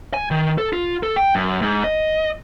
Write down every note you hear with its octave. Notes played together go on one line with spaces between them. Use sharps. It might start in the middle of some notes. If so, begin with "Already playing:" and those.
G#5
D#3
A4
F4
A4
G5
F#2
G#2
D#5